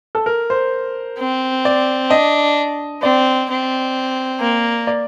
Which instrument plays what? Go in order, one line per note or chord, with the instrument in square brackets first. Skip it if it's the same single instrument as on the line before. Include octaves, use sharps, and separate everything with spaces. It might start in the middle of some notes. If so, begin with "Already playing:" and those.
[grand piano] A4
A#4
C5
[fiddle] C4
[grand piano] D5
[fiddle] D4 [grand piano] D#5
[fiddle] C4 [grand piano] D5
[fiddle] C4
A#3
[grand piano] D5